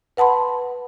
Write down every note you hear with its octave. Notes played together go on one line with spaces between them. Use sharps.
B4 F#5 A5 B5 C6